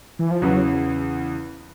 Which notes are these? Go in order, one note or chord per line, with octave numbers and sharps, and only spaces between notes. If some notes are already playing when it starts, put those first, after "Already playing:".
E3
F3
E2 C#3 E3 F#3